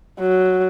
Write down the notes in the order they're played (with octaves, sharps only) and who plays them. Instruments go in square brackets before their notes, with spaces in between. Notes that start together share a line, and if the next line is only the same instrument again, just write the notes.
[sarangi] F#3